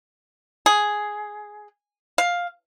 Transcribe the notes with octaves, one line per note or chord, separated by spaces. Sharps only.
G#4
F5